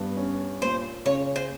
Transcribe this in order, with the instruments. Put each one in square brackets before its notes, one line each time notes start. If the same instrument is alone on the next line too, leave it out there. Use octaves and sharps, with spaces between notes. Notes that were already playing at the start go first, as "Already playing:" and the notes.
Already playing: [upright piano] G2 B3
C#4
[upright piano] A#2 [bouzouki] C5
[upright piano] C#3 [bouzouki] C#5
[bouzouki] C5